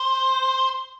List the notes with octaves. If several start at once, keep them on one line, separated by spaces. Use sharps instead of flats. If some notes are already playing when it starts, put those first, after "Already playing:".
Already playing: C5